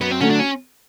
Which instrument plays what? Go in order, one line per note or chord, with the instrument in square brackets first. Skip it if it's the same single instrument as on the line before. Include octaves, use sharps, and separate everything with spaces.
[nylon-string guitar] F#2 [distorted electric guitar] B3
[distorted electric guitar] C4
[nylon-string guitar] D3 F#3 A3 [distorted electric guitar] C#4
[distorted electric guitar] D4
C#4